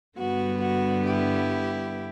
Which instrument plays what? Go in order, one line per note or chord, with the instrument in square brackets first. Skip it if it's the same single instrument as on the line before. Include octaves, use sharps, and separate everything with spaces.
[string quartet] G2 D3 G3 B3 F#4
F#4
E4 G4